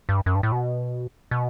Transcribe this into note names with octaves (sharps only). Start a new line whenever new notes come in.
G2
F#2
G2
A2
B2
B2